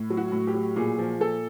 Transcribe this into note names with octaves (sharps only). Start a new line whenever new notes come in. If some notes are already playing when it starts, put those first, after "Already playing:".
Already playing: A2
F#3
F#4
A2
G4
F#3
A#2 G#4
F3
A#2 A4